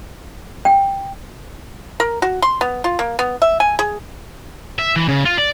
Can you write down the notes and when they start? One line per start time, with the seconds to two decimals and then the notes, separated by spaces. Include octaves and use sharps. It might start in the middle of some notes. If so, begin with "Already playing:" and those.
0.65 G5
2.00 A#4
2.22 F#4
2.42 C6
2.61 B3
2.84 F4
2.99 A#3
3.19 B3
3.42 E5
3.60 G#5
3.79 G#4
4.79 E5
4.96 E3
5.08 C#3
5.25 F4
5.38 D5